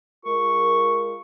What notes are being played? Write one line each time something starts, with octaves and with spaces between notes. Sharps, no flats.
G#3 F4 A#4 C#6